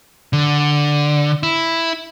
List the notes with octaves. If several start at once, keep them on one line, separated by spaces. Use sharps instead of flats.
D3
E4